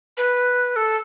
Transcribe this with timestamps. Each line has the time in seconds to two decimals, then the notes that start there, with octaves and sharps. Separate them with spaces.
0.17 B4
0.76 A4